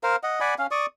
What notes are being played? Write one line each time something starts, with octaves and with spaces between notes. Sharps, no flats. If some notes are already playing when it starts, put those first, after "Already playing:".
A#4 C5 F5
D#5 F#5
D5 F#5 G#5 B5
C#4 F5
D5 C#6 D#6